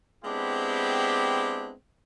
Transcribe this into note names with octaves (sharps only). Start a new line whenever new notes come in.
G#3 B3 C4 D4 E4 G4